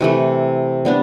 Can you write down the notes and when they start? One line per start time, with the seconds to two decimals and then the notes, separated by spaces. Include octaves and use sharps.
0.01 C3 E3 A3
0.85 G3 B3 D4